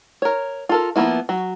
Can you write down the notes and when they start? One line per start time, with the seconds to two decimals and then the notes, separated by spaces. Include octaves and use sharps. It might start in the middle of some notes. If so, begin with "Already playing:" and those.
0.22 A#4 C#5
0.69 F4 A4 A#4
0.96 F3 G3 A#3 B3 E4
1.29 F#3